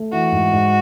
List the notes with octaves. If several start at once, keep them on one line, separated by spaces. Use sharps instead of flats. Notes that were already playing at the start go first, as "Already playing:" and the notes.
Already playing: A3
E3 F#4
G#2
G#2